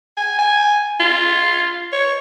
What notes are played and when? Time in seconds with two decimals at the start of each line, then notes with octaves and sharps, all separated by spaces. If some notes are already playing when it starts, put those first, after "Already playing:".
0.17 G#5
0.39 G#5
1.00 F4
1.92 C#5